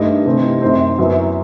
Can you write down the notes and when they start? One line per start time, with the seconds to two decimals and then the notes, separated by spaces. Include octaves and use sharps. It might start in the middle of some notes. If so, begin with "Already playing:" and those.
Already playing: G2 D#3 A3 D#5
0.26 C3 E3 A3 C4 D#4
0.62 F#2 D#3 A3 C4 C5
0.98 F#2 F#3 B3 E4